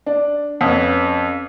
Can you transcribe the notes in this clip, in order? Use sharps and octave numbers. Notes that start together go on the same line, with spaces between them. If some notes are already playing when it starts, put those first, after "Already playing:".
D4
F2 C#4 B4